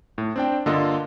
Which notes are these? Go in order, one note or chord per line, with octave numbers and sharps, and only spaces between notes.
A2
C4 D4 G5
G2 D3 A#3 F4 A4 D#5